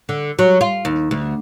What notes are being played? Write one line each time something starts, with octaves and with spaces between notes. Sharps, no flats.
D3
F#3
F4
D#2
D2